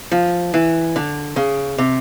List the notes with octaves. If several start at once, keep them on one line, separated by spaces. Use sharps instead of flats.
F3
E3
D3
C#3
C3